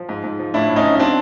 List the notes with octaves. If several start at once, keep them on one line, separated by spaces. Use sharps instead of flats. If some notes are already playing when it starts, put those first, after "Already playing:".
Already playing: F3
G#2
G#2
F3
A2 D4 E4
A2
C#4 D#4
F3
D#4
C4 D4